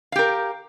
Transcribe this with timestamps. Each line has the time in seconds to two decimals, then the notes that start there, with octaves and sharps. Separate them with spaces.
0.12 F5
0.16 G4
0.19 A#4